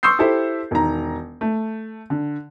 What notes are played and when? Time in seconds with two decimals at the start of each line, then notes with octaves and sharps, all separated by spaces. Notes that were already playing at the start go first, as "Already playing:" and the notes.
0.03 C6 C#6 D#6 E6 G6 C7
0.19 E4 G4 A4 C5 E5
0.71 E1 D#3 A#5
1.41 A3
2.10 D3